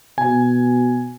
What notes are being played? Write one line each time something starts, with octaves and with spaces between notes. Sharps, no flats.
B2 G#5